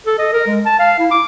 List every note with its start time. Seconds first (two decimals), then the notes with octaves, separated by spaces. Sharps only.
0.06 A4
0.19 D#5
0.33 A#4
0.47 G#3
0.66 A5
0.79 F5
0.99 E4
1.11 D6